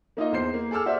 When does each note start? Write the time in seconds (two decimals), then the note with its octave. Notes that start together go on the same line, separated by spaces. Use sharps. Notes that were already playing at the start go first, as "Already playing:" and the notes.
0.17 A#3 D#4 F4 D#5
0.32 E2 C5 C7
0.54 A#3
0.71 G#4 A4 D6 E6 F6
0.86 F#4 C5 D5 E5